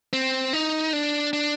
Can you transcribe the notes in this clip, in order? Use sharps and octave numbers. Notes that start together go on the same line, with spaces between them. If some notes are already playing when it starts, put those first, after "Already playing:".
C4
D#4
D4
D4